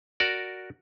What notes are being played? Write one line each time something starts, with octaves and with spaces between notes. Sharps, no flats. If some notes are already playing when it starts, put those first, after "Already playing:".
F#4 A#4 D5